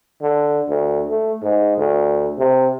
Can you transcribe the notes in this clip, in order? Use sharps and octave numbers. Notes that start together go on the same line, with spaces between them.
D3
D2
A3
G#2
D2
C3